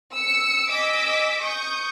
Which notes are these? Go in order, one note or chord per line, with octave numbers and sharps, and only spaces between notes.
E6 C#7
D#5 G#5 D6 E6 B6 D7
C#6 D#6 G6